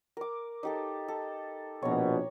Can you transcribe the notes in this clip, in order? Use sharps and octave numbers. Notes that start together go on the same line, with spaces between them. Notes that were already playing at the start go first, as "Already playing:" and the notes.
A#4 D6
D#4 G4 A4
A4
A#1 B2 C#5 A#5